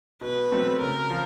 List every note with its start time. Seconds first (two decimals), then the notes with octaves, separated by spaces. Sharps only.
0.21 B2 B4
0.52 F#3 A3 C4
0.81 C#3 A#4
1.10 F3